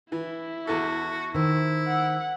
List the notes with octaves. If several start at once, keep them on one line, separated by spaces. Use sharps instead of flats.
E3 E4
E2 F#4 A4
D#3 E4 C5
F#5